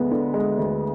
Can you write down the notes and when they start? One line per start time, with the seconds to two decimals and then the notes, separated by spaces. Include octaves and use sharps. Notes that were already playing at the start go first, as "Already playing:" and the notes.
Already playing: D2 G#3 B3
0.11 D3
0.34 G#3
0.58 D2